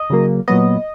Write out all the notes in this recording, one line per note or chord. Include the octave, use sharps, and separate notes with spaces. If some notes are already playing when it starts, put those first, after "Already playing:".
Already playing: D#5
C#3 F#3 A#3
A#2 F#3 B3 D#5